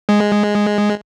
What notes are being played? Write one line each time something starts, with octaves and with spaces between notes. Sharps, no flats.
G#3